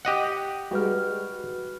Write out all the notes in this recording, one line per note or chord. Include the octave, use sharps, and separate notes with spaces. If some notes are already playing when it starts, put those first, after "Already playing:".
G4 D#5 F#5
G3 G#3 F#4 B4 G5 F6